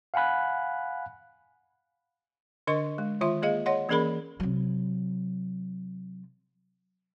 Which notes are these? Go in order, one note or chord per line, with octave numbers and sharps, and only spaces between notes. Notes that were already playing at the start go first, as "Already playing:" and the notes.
F5 F#5 G#5 B5 F#6
D3 D4 A#4 D#5 C#6
G#3
D#3 F4 E5 C6
A#3 G#4 D#5 F5
C#5 D#5 F#5 C6
E3 A#3 C#4 G#4 A#4 B5
C3 F#3